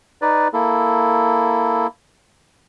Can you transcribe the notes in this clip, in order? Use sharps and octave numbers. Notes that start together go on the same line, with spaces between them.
D#4 B4 D5
A#3 E4 A4